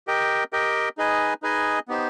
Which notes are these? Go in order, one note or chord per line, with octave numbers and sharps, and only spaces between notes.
G4 A#4 D#5 G5
G4 A#4 D#5 G5
D#4 G#4 B4 D#5 G#5
D#4 G#4 B4 D#5 G#5
B3 D#4 G4 C5